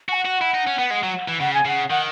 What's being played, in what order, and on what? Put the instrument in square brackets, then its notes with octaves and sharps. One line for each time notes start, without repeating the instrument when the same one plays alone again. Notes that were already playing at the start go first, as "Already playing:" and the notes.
[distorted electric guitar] F#4 [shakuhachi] G#5
[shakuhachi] F#5
[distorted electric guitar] F#4
E4
D#4
C#4
B3
G#3
F#3
E3
[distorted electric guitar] C#3 [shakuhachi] F#5
[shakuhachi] G#5
[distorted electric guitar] C#3 [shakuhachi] F#5
[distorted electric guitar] D#3 [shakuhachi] F#5